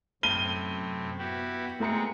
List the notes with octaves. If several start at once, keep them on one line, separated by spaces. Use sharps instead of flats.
F#2 A2 C3 C4 D#7 G7
B3 E4 F#4 G4
G#3 A3 C4 A#5 C#7